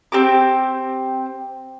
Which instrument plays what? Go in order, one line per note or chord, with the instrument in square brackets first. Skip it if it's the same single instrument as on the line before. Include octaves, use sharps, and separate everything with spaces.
[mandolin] C4 G4 D6